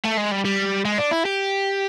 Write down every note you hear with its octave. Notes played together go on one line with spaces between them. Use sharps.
A3
G#3
G3
G3
G#3
D4
E4
G4